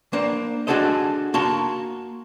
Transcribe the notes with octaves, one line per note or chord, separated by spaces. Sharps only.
A#3 D4 C5
D4 F#4 G#4 A4 C5 D#5
A#3 F#4 A5 C6